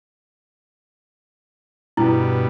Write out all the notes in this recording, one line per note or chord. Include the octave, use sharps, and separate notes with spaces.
G2 B2 E4